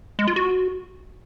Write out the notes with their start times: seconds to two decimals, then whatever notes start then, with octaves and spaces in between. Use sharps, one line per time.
0.19 G#3
0.27 F4
0.36 F#4